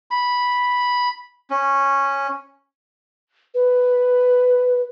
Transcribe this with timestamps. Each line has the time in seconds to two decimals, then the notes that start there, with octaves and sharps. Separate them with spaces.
0.11 B5
1.50 C#4
3.54 B4